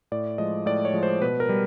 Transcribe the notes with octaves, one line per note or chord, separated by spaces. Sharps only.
A2 D5
F3 G#3 D#5
A2 D5
C#5
F3 G#3
C5
B2 B4
A#4
G3